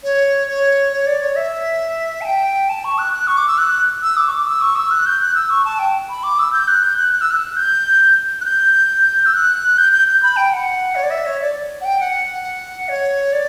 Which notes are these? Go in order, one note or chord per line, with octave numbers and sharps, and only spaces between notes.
C#5
C#5
C#5
D5
C#5
E5
A5
G5
A5
C#6
F#6
F#6
C#6
D6
E6
F#6
E6
D6
C#6
D6
E6
C#6
E6
F#6
G6
F#6
E6
C#6
A5
G5
B5
D6
E6
G6
F#6
G6
F#6
F#6
E6
F#6
G6
F#6
G6
E6
F#6
G6
G6
G6
B5
G5
F#5
C#5
D5
E5
C#5
D5
F#5
G5
F#5
C#5
D5